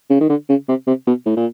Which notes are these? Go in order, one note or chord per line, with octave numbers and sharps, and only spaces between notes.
C#3
D#3
D3
C#3
C3
C3
B2
A2
A#2